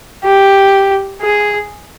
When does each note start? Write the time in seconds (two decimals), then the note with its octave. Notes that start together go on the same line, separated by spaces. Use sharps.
0.24 G4
1.22 G#4